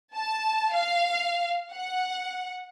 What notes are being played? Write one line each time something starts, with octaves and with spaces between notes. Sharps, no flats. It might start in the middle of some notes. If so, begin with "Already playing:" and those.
A5
F5
F#5